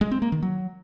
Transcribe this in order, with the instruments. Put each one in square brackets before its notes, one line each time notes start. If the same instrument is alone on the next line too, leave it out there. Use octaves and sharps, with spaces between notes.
[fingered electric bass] G#3
C4
A#3
D#3
F#3